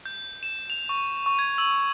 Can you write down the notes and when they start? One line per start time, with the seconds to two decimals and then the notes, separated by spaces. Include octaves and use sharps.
0.05 G6
0.43 E7
0.70 F7
0.89 C#6
1.26 C#6
1.39 G#6
1.58 E6